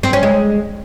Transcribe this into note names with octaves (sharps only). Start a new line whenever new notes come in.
C4
C#4
G#3